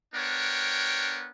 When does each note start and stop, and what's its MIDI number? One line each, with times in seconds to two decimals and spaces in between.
0.15 1.30 59
0.15 1.30 62
0.15 1.30 70
0.15 1.30 73
0.15 1.30 79